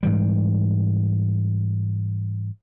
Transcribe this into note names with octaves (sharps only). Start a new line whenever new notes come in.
G#2 E3 G3